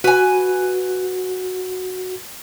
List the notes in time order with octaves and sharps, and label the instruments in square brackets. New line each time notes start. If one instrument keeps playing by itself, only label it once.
[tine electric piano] F#4 [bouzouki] B4 G#5